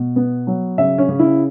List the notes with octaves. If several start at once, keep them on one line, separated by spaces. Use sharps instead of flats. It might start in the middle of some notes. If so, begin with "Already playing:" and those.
Already playing: B2
B3
F#3
C#3 E5
C#4
C#3
E4